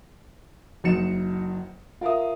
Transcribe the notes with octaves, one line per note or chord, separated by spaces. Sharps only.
F#1 F#3 D#4 C#7 E7
F4 A#4 E5 D#6